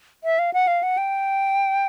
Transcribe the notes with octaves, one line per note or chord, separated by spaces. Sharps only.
E5
F5
F#5
F5
F#5
G5